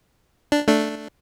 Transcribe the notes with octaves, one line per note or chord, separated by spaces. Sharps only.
D4
A3 D4